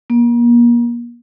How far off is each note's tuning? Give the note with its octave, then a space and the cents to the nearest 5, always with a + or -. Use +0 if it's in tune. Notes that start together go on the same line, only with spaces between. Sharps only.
A#3 +35